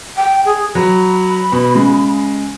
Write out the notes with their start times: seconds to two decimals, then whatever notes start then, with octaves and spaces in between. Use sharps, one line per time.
0.17 G5
0.45 G#4
0.75 F#3 B5
1.52 B2
1.75 C#3 G#3